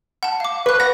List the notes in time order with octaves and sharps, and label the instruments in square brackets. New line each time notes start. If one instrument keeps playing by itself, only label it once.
[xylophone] F#5 A5
F5 D6
[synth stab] B4 [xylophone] C#6 F#6
[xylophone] F#5 [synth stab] A#6